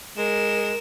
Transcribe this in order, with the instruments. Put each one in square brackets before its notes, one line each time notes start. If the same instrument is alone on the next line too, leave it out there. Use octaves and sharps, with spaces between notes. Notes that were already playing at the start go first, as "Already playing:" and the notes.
[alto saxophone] G#3 [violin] A#4 E7